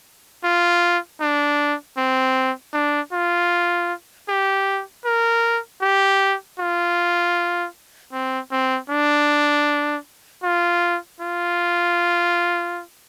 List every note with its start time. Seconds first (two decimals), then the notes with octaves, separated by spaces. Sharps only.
0.44 F4
1.21 D4
1.98 C4
2.74 D4
3.13 F4
4.29 G4
5.05 A#4
5.82 G4
6.59 F4
8.13 C4
8.52 C4
8.90 D4
10.44 F4
11.20 F4